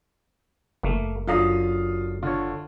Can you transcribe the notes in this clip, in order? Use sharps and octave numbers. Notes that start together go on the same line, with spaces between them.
F#1 A3 A#3
F#2 D3 F4 F5 A#5 D#6
D3 F4 C#5